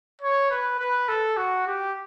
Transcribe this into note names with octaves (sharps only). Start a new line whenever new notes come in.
C#5
B4
B4
A4
F#4
G4